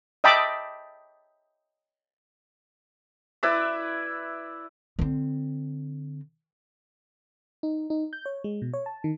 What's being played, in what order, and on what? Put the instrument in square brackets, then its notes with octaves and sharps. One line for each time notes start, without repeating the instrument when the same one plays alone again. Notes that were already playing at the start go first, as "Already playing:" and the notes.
[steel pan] D#5 E5 G5 A5 B5 D6
[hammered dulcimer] E4 B4 D5 E5
[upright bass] D3 C4
[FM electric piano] D#4
D#4
G6
C#5
G#3
B2
C#5
A5
D#3